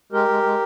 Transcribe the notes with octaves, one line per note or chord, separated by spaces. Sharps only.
G#3 G4 A#4
G#3
G#3